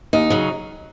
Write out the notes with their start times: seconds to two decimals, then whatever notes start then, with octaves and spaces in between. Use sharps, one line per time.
0.13 D#2 D#4
0.30 C#3 F#3